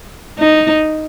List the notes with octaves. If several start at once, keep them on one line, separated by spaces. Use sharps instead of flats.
D#4